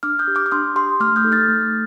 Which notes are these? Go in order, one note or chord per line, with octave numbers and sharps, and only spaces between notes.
D4 D6 F6
D#6 G6
G4
D6 F6
D6
D4 C6 D#6
G4 C6 D#6
A3 D6 F6
D#6 G6
D#4 A4
F6 A6
A3